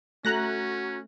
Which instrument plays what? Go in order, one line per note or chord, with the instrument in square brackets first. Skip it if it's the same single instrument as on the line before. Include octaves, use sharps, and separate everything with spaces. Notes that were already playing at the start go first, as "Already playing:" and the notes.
[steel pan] A3 [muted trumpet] C#4 [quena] F#4 [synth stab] A#5 F#6 A#6